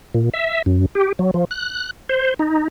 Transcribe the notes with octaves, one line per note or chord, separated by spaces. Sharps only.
A#2
E5
F#2
G4
F#3
F3
F#6
C5
D#4